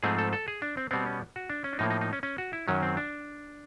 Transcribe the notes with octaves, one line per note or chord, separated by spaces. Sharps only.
G#2 F3 A3 C4 G#4
A4
A4
G#4
D4
C4
B2 G3 B3 C4
C#4
F#4
D4
C#4
D4
A2 F3 A#3 D#4
D#4
D#4
C#4
C#4
F#4
E4
F#2 D#3 F#3 C#4
C4
D4